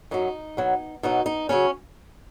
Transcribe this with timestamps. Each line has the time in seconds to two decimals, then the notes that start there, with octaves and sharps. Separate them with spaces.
0.11 F#2 F#3 D#4
0.57 B2 F#3
1.03 B2 F#3 D#4
1.26 D#4
1.49 C#3 F#3 C#4